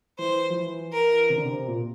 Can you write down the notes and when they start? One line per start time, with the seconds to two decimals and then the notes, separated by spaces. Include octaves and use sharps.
0.19 E3 C5
0.50 F3
0.57 E3
0.93 A#4
1.30 C3
1.37 D3
1.45 C3
1.68 A#2